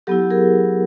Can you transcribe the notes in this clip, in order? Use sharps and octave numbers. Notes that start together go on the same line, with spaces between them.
F#3 B3 E4 G4 A4
G#4 A#4